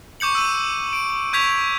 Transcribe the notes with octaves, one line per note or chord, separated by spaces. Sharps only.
C#6 D6 G6 C#7 F#7
E6 D#7
D7
C#6 G6 G#6 B6 F7